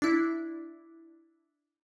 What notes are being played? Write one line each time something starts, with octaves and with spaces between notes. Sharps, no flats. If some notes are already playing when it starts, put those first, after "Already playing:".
D4 E4